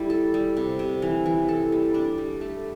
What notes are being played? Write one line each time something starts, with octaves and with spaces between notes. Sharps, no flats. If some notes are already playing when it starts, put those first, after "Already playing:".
Already playing: G3 A3 E4
A4
G3
C3
C3
E3
E3
A4
G3
D4
G3
A3